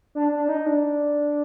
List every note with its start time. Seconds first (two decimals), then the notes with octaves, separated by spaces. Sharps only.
0.15 D4
0.32 D4
0.49 D#4
0.66 D4